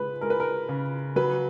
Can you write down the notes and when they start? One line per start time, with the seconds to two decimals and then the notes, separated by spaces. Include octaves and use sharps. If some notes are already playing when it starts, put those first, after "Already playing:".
Already playing: C#3 G#3 B4
0.21 G#3 A#4
0.30 B4
0.40 A#4
0.69 C#3
1.16 F#3 B4